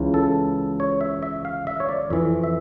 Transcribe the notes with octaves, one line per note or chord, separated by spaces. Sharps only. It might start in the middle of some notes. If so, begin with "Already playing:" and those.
Already playing: C#2 C#3 E3
A4
C#5
E5
E5
F5
E5
C#5
D5
F2 E3 E5
E5